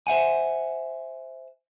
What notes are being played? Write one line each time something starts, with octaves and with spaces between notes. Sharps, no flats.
C5 E5 F#5 G#5